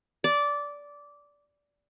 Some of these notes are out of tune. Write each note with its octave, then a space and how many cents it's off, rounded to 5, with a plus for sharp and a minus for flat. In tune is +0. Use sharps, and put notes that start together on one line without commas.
D5 -15